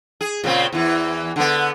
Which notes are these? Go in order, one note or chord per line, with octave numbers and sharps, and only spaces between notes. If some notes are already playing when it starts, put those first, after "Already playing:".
G#4
A#2 C#3 C4
E2 E3
D3 B3